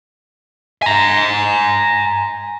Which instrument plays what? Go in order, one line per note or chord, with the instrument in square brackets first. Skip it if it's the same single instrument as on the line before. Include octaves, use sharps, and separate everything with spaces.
[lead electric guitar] G#5 A#5